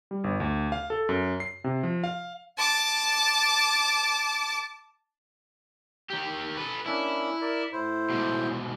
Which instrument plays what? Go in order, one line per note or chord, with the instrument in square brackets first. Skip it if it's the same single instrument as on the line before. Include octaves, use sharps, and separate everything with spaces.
[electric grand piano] G3
G1
D2
F5
A4
F#2
C7
C3
F3
F5
[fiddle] A5 D6
[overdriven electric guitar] D#3 G4
A4 B4
[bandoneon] A#3 C#4 D4 [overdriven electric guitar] E4
[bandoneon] A#4 D5
A2 E4 C5
[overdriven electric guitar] G#2 B2